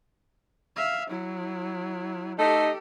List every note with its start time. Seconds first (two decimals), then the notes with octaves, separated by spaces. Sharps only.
0.76 E5 F5
1.10 F#3 E4
2.39 A3 D#4 G4 A4